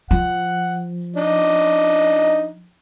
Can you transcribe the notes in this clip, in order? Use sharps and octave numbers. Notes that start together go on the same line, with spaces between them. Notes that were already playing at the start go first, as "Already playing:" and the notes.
F3 F#5
D4 D#4